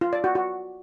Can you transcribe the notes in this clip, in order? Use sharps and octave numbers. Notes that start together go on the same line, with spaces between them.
F4
D5
F#4
F#4